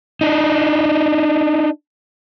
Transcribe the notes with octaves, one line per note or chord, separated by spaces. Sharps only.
D4 D#4